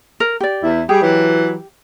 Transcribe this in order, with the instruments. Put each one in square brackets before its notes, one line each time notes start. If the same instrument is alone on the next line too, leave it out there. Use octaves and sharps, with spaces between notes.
[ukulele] A#4
G4 D5
[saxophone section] E2 E4
[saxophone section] G3 G#4 [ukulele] G4
[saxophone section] E3 F#3